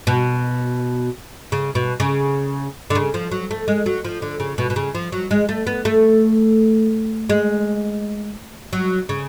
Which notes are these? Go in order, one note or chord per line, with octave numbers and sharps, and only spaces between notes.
B2
C#3
B2
C#3
D3
C#3
F3
F#3
A3
G#3
F#3
F3
D3
C#3
B2
B2
C#3
F3
F#3
G#3
A3
B3
A3
G#3
F#3
C#3